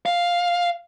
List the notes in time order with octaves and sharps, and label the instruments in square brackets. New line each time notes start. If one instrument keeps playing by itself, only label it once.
[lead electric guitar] F5